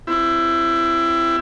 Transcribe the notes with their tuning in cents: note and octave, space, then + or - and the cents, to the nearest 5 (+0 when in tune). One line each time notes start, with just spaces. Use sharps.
C4 +0 E4 +20 G4 +0